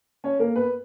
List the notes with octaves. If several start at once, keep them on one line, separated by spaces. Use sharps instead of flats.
C#4 C#5
A#3 A#4
B3 B4